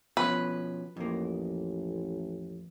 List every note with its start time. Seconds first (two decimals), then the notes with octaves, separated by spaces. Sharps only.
0.17 B2 F3 C#4 B4
0.97 A1 F2 A#3